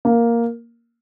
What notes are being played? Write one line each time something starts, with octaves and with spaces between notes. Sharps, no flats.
A#3